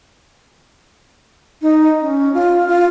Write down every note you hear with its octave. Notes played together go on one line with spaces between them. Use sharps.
D#4
C#4
F4
F4